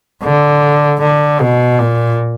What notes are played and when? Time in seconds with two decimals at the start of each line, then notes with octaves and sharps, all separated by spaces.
0.23 D3
1.01 D3
1.40 B2
1.79 A#2